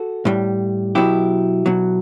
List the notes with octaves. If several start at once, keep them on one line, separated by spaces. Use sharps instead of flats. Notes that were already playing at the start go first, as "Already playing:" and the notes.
Already playing: F#4 A4
A2 G3
B2 F#3 E4 G4
B2 F#3